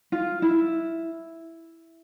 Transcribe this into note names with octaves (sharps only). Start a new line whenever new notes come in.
F4
E4